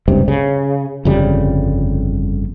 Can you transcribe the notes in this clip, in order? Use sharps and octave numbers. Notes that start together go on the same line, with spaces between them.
F#1 C#2 G2 C3
C#3
G1 F2 C#3 G3